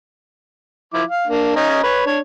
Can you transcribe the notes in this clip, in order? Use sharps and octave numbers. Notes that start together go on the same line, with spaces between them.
F3 E4 D6
F5
A#3 D4
C#4 D#5 A#5
B4 C#5
D4 C#5